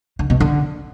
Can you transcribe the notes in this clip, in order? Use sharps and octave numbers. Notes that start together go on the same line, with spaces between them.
D3
B2
D3